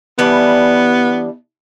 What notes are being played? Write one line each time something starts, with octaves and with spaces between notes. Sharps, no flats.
E3 G3 B3 D4